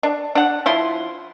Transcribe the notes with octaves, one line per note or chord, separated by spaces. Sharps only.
D4
D4 F#5
F3 E4 C6